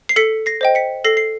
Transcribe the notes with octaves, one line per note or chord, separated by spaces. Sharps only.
C7
A4 B6 C#7
A#6 C7
C5 D#5 G5
B6 C#7
A4 A#6 C7
C7